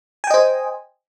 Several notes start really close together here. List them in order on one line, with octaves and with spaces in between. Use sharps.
G#5 G5 D#5 C5